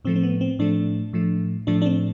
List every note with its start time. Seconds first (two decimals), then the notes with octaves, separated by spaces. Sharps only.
0.05 A2 F3 A3 C4
0.16 C4
0.23 B3
0.41 C4
0.59 A2 F3 A3 D4
1.13 A2 F3 A3
1.67 A2 F3 A3 D4
1.82 D4
1.85 C4